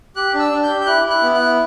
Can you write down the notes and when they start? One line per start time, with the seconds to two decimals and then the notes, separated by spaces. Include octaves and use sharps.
0.16 G4 F#6
0.34 D4
0.39 E6
0.52 D4
0.64 G6
0.70 G4
0.81 G6
0.87 E4 F#6
1.05 E4
1.10 F#6
1.22 B3
1.34 F#6
1.40 E4